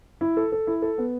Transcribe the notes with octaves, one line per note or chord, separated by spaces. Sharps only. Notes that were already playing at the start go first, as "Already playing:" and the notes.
E4
A4
A4
E4
A4
B3